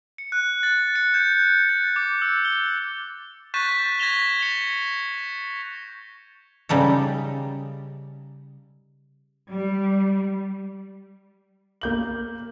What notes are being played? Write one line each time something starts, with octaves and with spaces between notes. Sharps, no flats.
C#7
F#6
A6
C#7
G6
G6
A6
D6
E6
G7
C#6 F#6 G6 A6 B6 E7
G#6 A#6 B6 E7 F7 G7
C#7 F7 G7
C#3 G3 D#4 A4
G3
A#3 G6 F#7